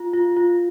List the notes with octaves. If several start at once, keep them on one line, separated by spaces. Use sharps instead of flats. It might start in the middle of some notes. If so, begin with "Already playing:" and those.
Already playing: F4
F4
F4